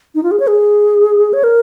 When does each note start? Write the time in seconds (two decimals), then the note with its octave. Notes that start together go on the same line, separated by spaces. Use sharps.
0.15 D#4
0.23 F4
0.31 G#4
0.40 C#5
0.47 G#4
1.33 C#5
1.44 A#4